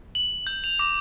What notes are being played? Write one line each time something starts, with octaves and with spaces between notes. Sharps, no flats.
F#7
G6
F7
D6